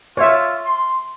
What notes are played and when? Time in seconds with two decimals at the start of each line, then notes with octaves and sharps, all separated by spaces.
0.17 F4 C#5 E5
0.64 C6